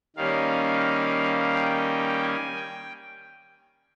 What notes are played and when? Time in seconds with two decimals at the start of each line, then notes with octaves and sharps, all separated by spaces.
0.16 D#3 G3 A#3 C#4 F5
1.54 G5
2.23 G#5
2.57 G5